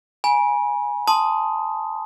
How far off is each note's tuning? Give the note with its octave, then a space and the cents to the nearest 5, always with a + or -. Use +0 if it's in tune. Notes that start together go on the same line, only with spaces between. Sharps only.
G#5 +0 B5 -40
A5 +0 C6 +0 D#6 +0